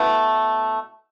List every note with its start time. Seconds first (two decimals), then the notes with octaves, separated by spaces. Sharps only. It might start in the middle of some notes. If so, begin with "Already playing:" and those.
Already playing: B2 A3 E4 B4